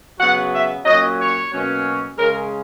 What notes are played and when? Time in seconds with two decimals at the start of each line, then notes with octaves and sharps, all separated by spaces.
0.19 C#3 F#3 B3 F#5
0.52 E5
0.85 A#2 F#3 C#4 D#5
1.19 C#5
1.52 B2 F#3 A#3 C#4
2.17 C#3 G#3 C#4 A#4